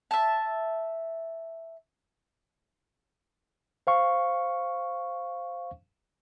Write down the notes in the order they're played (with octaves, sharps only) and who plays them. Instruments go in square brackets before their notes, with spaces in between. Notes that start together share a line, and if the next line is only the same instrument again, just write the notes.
[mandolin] E5 A5
[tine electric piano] C5 F5 C#6